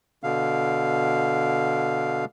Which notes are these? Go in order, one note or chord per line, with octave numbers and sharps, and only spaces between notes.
B2 D3 F5